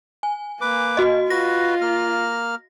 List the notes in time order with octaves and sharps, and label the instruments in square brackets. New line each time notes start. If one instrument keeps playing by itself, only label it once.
[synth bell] G#5
[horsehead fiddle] A#3 [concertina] B4 D6
[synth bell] F#4 D#5
[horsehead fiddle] F4 [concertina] F#4 B4 [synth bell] A#6
[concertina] A#3 F6